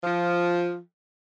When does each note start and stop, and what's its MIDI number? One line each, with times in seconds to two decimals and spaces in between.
0.04 0.78 53